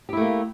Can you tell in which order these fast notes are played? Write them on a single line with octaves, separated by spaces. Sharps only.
G4 E4 A3 A#3